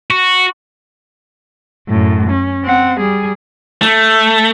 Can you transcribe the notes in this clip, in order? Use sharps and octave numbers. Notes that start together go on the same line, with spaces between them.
F#4
F#2 A2
C#4
C4 F#5
G3 G#4
A3